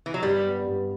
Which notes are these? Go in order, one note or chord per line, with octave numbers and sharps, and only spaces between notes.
E3
F#3
G2 G3
B3
G2